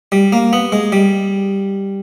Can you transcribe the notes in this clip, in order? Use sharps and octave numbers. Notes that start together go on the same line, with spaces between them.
G3
A#3
B3
G#3
G3